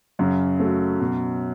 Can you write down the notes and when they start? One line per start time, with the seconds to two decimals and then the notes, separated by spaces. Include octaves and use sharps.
0.19 F#2 C#3
0.59 A3 F#4
1.00 B2